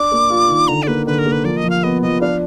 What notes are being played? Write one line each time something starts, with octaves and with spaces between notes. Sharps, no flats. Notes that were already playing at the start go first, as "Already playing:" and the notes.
Already playing: D4 D6
A#3
F4
D#3
D3 A#5
D5
A#3 B4
D3 B4
A#4
A#3
B4
F3 D5
D#5
F3
F5
B3 D#5
F3 D#5
D4 F5